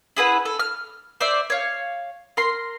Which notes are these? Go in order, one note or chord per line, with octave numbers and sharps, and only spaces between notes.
E4 G#4 B4 F#5
A4
F6
C5 D5 E5
C#5 F5
A#4 C6